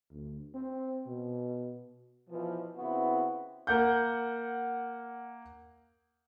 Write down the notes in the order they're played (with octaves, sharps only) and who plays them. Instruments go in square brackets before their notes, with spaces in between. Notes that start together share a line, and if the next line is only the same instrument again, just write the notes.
[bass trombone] D2
C4
B2
[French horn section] B2 E3 F3
C#3 B3 C4 E4 F#4
[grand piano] A#3 F#5 G6